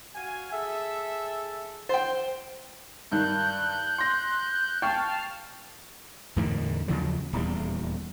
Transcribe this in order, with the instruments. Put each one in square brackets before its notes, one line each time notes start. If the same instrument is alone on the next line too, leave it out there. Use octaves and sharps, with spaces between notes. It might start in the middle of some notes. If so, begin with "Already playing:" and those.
[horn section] F#4 F5 G#5
G#4 A4 E5
[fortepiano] C5 G5
[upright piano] G2 D#3 [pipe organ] F#6 G6
[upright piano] C6 A#6
[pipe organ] F5 A5 F6 [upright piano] G5 C#6 G6
[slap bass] E2 A2 D3 D#3
D#2 C#3 F3 F#3
D#1 E2 G3